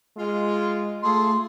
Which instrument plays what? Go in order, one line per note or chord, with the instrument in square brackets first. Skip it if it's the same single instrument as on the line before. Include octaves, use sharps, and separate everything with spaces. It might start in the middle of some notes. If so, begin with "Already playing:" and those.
[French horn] G#3 [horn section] F4
[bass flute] A3 [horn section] F4 G#4 A4 [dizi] C6